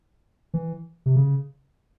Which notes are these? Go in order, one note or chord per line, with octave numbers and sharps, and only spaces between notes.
E3
C3
C#3